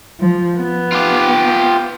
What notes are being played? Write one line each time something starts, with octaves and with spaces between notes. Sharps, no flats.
F3
B3
F4 G4